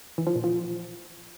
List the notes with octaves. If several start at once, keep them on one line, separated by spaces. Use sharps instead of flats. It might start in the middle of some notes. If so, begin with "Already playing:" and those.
E3
F3
A#2
F3